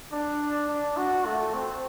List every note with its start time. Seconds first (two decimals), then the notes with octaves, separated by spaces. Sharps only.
0.12 D4
0.69 D4
0.97 F#4
1.26 A3
1.54 C4